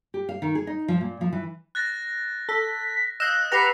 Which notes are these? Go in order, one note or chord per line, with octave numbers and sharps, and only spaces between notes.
G4
F5
D#3
G#4
D#4
F3
A#2
F3
E3
F#6 A6 A#6
A4 B6
D#5 F5 E6 F#6 G6 E7
G4 B4 F#5 A#5 A#6 C7 F7